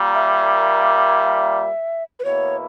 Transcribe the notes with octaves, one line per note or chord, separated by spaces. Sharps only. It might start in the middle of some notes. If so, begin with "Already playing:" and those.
Already playing: A#2 G3 A#3
E5
B4
E2 B2 A#3 E4 C#5